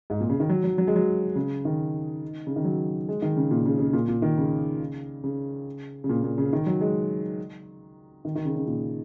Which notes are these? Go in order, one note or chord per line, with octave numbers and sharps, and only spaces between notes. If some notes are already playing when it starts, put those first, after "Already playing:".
G#2
A#2
C#3
D#3
F#3
F#3
F#3
G#3
F#3
C#3
D#3
C#3
D#3
F#3
G#3
D#3
C#3
A#2
C#3
C#3
A#2
A#2
D#3
C#3
C#3
C#3
A#2
A#2
C#3
D#3
F#3
G#3
D#3
D#3
C#3
C#3
A#2